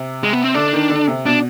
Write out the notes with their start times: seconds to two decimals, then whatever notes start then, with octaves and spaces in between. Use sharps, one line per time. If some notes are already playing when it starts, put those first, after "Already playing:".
Already playing: C3
0.23 G#3
0.33 B3
0.44 C4
0.54 D3 D4
0.73 D#3
0.90 D3
1.07 C3
1.26 B2 D4